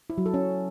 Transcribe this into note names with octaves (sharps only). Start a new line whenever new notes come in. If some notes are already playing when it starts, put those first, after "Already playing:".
E4
F#3
A4
C#4